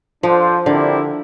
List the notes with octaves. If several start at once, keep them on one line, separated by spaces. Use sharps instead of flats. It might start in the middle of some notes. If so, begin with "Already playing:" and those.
F3 D4 F4 A4 C5
D3 C4 E4 G4 A#4 D5